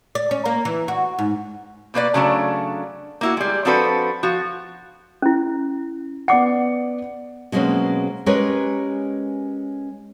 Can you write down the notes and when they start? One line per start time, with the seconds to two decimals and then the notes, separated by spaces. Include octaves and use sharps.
0.15 D5
0.31 C#4
0.45 A#3
0.65 E3
0.88 F#4
1.19 G#2
1.94 B2 A#3 B4 D5
2.14 C#3 F#3 A3 D4
3.21 A#3 E4 F#4
3.37 G3 G#3
3.65 F3 C4 D4 F#4 A4 B4
4.23 F3 F#4
5.22 C#4 E4
6.28 B3 D5 F#5 D6 C#7
7.52 B2 F#3 G#3 A#3 C4 C#4
8.26 G#3 C#4 G4 A#4 B4 C#5